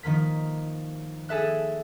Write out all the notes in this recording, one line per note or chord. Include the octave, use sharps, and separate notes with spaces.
D#3 F3 A#3 B6
G#4 A4 E5 F#6